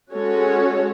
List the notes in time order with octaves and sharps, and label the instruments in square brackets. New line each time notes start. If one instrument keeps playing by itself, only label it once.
[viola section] G#3 C#4 F#4 A4 C#5